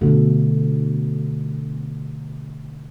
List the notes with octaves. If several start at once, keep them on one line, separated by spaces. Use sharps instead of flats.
B2 D3 F3 A3